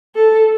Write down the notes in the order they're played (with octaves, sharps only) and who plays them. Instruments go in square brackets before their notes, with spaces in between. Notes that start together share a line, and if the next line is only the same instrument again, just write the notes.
[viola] A4